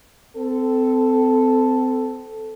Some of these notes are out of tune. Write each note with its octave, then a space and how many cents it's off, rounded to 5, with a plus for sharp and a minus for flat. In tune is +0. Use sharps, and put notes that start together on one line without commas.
C4 -30 A4 +0